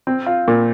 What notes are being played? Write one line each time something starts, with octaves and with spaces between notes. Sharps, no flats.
C4
F4
A#2